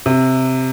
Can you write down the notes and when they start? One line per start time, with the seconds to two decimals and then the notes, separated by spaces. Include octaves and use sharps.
0.06 C3